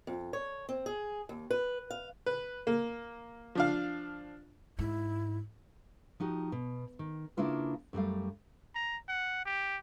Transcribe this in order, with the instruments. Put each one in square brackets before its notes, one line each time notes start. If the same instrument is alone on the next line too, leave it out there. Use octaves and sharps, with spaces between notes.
[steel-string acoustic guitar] F2
C#5
C4
G#4
D#2
B4
F5
[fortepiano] B4
A#3
F3 D4 F5
[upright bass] G#2 [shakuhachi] E4
[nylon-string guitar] F3 D#4 F#4 G4
B2
D#3
C#3 A#3 D4 E4 F4 B4
F#2 G3 A3 F5
[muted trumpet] A#5
F#5
G4